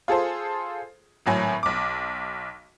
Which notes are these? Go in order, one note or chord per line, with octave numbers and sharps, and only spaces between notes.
F4 G#4 A4 C5
G#1 A2 F#3 G#5 B5
B1 D6